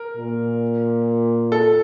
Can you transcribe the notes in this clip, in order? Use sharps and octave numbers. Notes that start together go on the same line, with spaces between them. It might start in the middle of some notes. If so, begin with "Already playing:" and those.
Already playing: A#4
A#2
A4